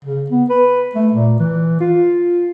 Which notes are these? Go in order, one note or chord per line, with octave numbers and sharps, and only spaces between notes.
C#3
B3
B4
A3
A#2
E3
F4